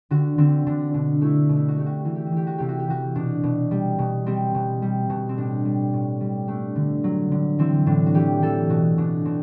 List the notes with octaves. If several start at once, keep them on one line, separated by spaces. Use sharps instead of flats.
D3 F#4
D3 C4
D3 D4
B2 D4
A3 E4
B2
E4
F#4
A3 G4
F#4
E3 F#4
G4
F#4
E3 G4
F#4
C3 G4
F#4
G4
E3 F#4
B2 D4
B2
G3
B2
G3 C4
B2
G3
B2
C4
A2 D4
G3
A2
G3
A3 D4
D3
F#3
D3
E3 C4
A2 D4
F#4
E3 G4
E3 A4
B2 F#4
B2 D4
B2 C4